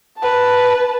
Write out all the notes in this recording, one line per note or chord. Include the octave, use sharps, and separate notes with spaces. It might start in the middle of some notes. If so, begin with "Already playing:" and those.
B4 A5